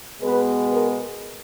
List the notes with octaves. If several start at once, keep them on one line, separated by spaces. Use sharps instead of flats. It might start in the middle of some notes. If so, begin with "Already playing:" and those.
B2 G#3 B3 B4
A#4